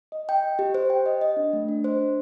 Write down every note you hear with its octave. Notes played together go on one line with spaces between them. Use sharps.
D#5
G5
D#5
G4
C5
G5
D#5
D#5
D4
A3
D4
C5
D4